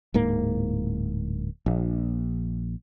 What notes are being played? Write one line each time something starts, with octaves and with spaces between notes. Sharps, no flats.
D1 G#2 A#3
A#1